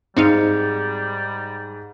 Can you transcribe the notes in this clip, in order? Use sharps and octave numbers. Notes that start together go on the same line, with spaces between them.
G#2 G3 C4 D#4 F5 C#7